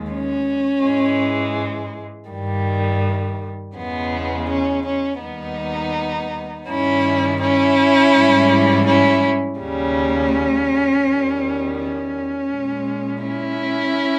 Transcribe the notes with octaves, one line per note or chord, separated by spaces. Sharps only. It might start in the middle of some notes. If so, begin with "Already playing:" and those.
Already playing: D#2 D#3 G#3
C#4
G#2 E3 G#3
G2 D#3 G3
E2 C#3 G#3 B3
C#4
C#4
D#2 D#3 G3 B3 D#4
G2 D#3 G3 C#4 E4
C#4 E4
G#2 E3 G3
C#4 E4
D#2 C#3 G3 C#4
E2 D#3 G3
C#4
A#2 G#3
C#4 E4